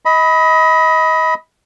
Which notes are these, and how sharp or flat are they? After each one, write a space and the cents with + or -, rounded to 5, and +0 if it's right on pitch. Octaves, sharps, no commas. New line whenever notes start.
D#5 +30 B5 +0